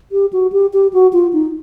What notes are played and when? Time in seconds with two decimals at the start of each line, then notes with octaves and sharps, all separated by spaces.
0.12 G4
0.33 F#4
0.52 G4
0.73 G4
0.93 F#4
1.13 F4
1.33 D#4